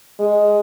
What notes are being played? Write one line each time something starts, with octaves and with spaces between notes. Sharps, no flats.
G#3